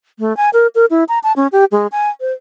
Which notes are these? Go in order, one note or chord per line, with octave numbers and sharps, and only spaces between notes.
A3
G#5
A#4
A#4
E4
A#5
A5
C#4
G4
G#3
G#5
C5